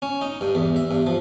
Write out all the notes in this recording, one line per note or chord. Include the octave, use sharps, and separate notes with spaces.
C#4
D#4
G2
E2
E5
G2
F3